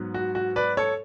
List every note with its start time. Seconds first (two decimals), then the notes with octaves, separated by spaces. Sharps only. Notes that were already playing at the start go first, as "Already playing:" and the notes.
Already playing: G#2 F#3 B3
0.14 F#4
0.35 F#4
0.56 B4 D5
0.77 A4 C#5